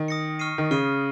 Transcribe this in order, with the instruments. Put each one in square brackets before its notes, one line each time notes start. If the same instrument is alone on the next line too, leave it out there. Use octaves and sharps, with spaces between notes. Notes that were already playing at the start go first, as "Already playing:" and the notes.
Already playing: [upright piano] D#3
[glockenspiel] D#6 A#6 C#7
C#6 F6 C7 D#7
[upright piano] D#3
[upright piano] C#3 [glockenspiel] C#6 F6 C7 D#7